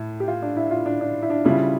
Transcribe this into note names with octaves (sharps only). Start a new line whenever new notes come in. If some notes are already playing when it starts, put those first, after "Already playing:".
Already playing: A2 E4
G4
F4
D4
E4
F4
D4
D4
E4
D4
C#3 G3 D4 E4 F4